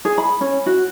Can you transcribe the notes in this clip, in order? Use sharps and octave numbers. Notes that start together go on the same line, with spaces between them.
G#4
B5
C#4
F#4